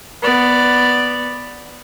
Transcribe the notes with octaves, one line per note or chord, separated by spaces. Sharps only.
B3 D5